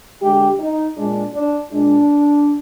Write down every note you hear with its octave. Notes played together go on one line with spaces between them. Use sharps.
D3 G#3 G4
D#4
A#2 G#3 D4
D4
A#2 G#3 D4